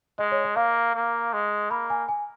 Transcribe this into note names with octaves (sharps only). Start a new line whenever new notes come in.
G#3 D#5
C#5
D#5
A#3 F5
A#3
G#3
A#3 B5
G#5
G#5